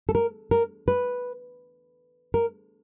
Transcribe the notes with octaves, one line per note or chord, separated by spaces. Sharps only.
A4
A#4
A#4
B4
A#4